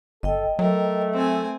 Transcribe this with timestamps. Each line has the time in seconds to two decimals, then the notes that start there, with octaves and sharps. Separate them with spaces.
0.23 G1 A4 D#5 G5
0.59 F#3 A3 A#4
1.13 C4 G#5